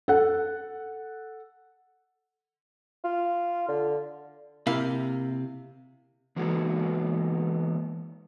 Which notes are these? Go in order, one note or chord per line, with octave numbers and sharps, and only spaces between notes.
A4 F#5
F4
D3
C3 A#3 E4 G4 F5
E3 G#3 A#3 B3 F#4